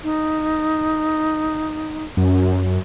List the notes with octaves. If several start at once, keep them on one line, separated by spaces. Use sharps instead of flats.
D#4
F#2